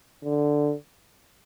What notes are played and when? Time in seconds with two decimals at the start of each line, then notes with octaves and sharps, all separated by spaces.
0.24 D3